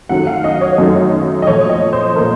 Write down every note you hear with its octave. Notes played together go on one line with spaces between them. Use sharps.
F#2 D#3 F#3 A3 F#5
F5
D#5
C#5
F#2 D#3 F#3 A3
D#5
A#2 F3 A3 C#5
D#5
C5
A#2 F3 A3 A#4